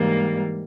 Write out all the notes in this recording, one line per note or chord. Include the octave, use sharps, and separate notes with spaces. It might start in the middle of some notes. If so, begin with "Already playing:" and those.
Already playing: G#2 E3 G3 A#3